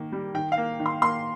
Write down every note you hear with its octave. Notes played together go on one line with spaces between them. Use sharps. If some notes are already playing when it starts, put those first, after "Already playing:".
Already playing: D#3 A#3
G3
D#3 G5
F5
A#3
D#3
C6
A#3 C6